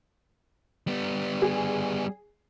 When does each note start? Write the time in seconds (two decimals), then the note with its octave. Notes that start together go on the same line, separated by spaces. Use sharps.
0.87 G3 B3
1.42 G#4